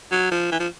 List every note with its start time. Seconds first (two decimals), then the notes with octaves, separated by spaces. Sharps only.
0.12 F#3
0.32 F3
0.52 E3
0.60 F3